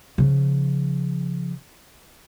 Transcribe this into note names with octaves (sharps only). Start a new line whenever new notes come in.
C#3 F3